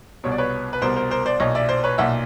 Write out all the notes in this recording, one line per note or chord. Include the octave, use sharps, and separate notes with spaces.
C2 B2 C#5
D5
B4 C#5
B4
C2 B2 A#4 C5
A#4 C5
A#4 C5
C5 D5
B1 A#2 C#5 D#5
D5 E5
C5 D5
B4 C#5
B1 A#2 E5 F#5